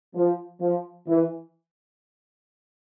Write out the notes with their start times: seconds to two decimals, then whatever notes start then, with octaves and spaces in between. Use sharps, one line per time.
0.16 F3
0.61 F3
1.08 E3